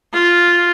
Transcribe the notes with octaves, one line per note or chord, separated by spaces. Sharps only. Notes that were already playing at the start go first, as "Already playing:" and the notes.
F4